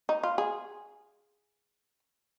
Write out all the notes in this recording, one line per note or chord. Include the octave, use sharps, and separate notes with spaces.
D#4
F4
G#4